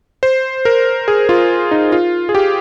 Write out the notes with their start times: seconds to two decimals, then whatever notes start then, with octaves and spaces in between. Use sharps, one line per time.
0.23 C5
0.65 A#4
1.08 G#4
1.29 F4
1.71 D#4
1.92 F4
2.29 G#4
2.35 G4